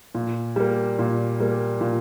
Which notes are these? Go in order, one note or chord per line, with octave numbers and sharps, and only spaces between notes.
A#2
G3 A#3
A#2
G3 A#3
A#2